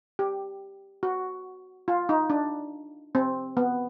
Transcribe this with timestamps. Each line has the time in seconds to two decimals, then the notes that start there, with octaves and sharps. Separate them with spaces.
0.19 G4
1.03 F#4
1.88 F4
2.09 D#4
2.30 D4
3.15 C4
3.57 B3